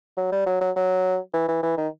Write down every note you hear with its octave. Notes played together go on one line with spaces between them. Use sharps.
F#3
G3
F#3
F#3
F#3
E3
E3
E3
D#3